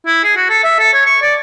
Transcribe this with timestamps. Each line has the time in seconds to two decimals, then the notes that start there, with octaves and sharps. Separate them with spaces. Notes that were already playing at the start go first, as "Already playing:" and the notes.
0.06 E4
0.24 G#4
0.36 F#4
0.50 A4
0.64 E5
0.79 A4
0.93 C#5
1.06 C#6
1.22 D5